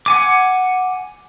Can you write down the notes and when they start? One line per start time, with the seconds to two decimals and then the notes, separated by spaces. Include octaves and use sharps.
0.06 F#5 G#5 D6